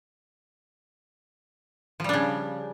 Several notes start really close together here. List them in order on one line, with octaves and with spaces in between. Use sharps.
F3 G3 D4 C#3